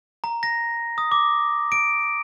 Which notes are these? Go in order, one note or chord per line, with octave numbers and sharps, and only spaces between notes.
A#5
A#6
D#6
D6
D7